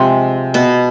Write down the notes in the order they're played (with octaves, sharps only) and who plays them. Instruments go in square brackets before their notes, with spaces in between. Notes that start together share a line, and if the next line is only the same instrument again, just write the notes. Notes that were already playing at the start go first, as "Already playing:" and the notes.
Already playing: [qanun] C3 F3 G#3 C4
B2 B3